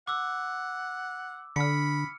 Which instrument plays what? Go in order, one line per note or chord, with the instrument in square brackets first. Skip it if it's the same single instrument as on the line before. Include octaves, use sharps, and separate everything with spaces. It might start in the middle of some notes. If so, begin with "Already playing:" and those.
[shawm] F#5 [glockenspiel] D6 E6
[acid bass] D3 [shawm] B5 [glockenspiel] F6 C#7